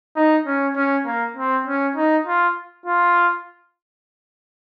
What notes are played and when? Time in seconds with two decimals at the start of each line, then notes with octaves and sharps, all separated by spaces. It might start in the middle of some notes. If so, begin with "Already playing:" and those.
0.16 D#4
0.46 C#4
0.76 C#4
1.06 A#3
1.36 C4
1.67 C#4
1.96 D#4
2.27 F4
2.86 F4